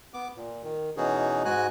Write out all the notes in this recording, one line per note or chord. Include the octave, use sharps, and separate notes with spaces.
B3 D6
A#2
D#3
B2 E3 C#4 D#4 F#4 G#4
G#2 G#3 F#4 G#5 F#6